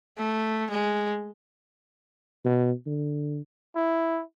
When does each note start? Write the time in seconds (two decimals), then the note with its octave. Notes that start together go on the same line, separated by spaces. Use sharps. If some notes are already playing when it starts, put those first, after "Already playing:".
0.17 A3
0.71 G#3
2.45 B2
2.87 D3
3.76 E4